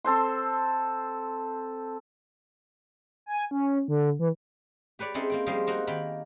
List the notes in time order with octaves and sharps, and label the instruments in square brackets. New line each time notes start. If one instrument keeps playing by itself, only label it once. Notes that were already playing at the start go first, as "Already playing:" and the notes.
[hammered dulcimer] C4 A4 C5 C6
[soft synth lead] G#5
C#4
D3
E3
[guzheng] G4 B4 C#5 D5
C4 C#4 D#4 E4 G#4 A4
A#3 C4 G5
F3 G3 D#4 G#4 A#4 C5
A#3 C4 D#4 F#4
D#3 A#3 G5 B5